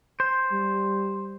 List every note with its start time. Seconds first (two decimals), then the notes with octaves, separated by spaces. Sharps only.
0.20 C5
0.52 G3